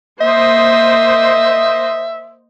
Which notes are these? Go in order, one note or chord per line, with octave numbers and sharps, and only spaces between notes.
A#3 C5 D#5 E5